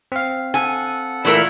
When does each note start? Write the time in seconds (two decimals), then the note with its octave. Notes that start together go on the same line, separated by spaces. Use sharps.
0.12 C4 F5
0.54 A4 F#5 G#5
1.25 A#2 E3 A3 E4 A#4